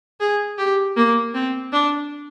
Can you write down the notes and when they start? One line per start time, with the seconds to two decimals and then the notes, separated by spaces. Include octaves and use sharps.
0.20 G#4
0.58 G4
0.97 A#3
1.34 C4
1.72 D4